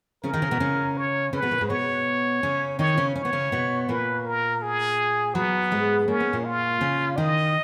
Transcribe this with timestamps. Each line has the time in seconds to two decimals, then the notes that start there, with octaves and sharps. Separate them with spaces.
0.24 C#3 C#4 A#4
0.33 D#3 D#4
0.42 C#3 C#4
0.51 B2 B3
0.60 C#3 C#4
0.97 C#5
1.33 C#3 C#4 B4
1.42 B2 B3
1.51 A#2 A#3
1.61 G#2 G#3
1.69 B2 B3 C#5
2.43 C#3 C#4
2.79 D#3 D#4 C#5
2.97 C#3 C#4
3.15 C#4 C#5
3.25 B3
3.33 C#3 C#4
3.52 B2 B3
3.89 A#2 A#3 B4
4.26 A#4
4.62 G#4
5.35 F#3 B3
5.71 G#2 G#3
6.08 A#3 C#4
6.20 B3
6.33 A#2 A#3
6.45 F4
6.81 C#3 C#4
7.18 D#3 D#4 D#5